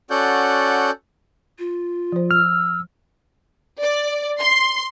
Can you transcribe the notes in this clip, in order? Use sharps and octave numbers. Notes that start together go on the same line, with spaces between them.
C#4 F#4 A4 D5 F#5 G6
F4
F3 C5
E6 F6
D5
C6